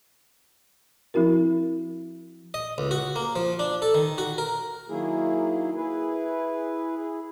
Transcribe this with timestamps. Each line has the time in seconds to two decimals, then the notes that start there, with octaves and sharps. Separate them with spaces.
1.14 F3 C4 E4 F#4 A#4
2.54 D#5
2.78 C#2
2.91 F#4
3.16 A#3
3.36 F3
3.59 D4
3.82 A4
3.94 D#3
4.18 F#4
4.38 A#4
4.89 D#3 F#3 A#3 E4 G#4
5.76 E4 G#4 B4
6.97 E4 G#4